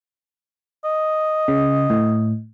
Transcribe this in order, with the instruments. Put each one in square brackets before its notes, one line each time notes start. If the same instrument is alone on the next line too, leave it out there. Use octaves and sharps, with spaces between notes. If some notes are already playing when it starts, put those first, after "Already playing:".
[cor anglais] D#5
[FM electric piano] C#3
A2